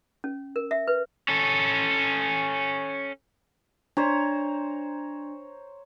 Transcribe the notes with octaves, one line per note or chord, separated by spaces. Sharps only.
C#4
A#4
E5
B4
C#4 A4
D4 C5 C#5 A#5